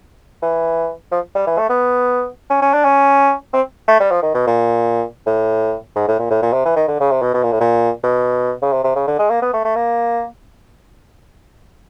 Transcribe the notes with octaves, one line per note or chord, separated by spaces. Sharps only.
E3
F3
G3
E3
A3
B3
C#4
C#4
D4
C#4
C4
A3
G3
F3
D#3
B2
A#2
A2
G#2
A2
A#2
A2
A#2
C3
E3
D#3
D3
C#3
C3
B2
B2
A#2
A2
A#2
B2
C#3
C3
C3
C#3
D3
G#3
A#3
B3
A3
A3
A#3